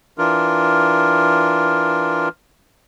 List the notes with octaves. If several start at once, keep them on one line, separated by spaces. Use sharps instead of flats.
E3 D4 F4 A#4